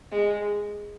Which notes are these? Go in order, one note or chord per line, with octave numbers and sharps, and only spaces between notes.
G#3